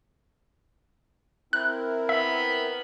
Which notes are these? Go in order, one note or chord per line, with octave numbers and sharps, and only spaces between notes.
C4 E4 A#4 F#6
B3 E5 B5